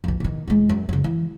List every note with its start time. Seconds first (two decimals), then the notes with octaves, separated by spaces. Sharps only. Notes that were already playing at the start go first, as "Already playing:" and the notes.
0.04 B1 F2
0.20 B2 D#3
0.48 E1 G#3
0.69 F#2
0.89 F#2 C#3
1.04 E3